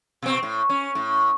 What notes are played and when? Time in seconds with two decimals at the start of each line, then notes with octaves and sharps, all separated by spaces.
0.22 B2 C4
0.43 A2
0.69 C#4
0.95 A2